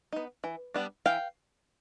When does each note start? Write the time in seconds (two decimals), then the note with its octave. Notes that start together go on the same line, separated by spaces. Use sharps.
0.13 B3 D#4
0.44 E3
0.74 G3 B3 D4
1.06 E3 F5 G5